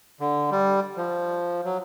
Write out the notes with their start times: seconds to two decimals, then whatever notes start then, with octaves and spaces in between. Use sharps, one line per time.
0.20 D3
0.51 G3
0.97 F3
1.64 F#3